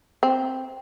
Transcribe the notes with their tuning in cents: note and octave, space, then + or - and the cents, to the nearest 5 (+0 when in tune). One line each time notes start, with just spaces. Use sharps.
C4 +0